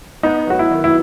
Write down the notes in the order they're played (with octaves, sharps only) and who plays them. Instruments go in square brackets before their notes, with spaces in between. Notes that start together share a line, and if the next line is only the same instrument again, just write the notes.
[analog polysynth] B3 [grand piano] D#4
[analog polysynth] F#3 [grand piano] F#4
[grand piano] E4
[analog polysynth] D#3
[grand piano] E4